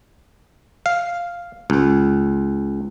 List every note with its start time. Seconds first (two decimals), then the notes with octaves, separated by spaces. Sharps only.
0.86 F5
1.70 C#2